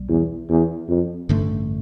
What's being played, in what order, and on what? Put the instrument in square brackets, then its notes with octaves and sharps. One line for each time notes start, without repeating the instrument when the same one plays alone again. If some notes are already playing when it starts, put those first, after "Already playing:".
Already playing: [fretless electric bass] B1 G3
[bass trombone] E2
E2
F2
[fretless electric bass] A1 G2 D3 A3